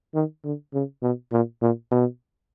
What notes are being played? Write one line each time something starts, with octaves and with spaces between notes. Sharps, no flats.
D#3
D3
C#3
B2
A#2
A#2
B2